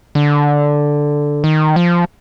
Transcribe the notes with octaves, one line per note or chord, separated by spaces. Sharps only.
D3
D#3
F3